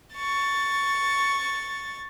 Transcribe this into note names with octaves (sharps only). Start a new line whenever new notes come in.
C#6 A6